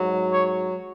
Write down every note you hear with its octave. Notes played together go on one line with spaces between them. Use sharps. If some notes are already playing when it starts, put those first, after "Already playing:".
Already playing: G#2 F#3
C#5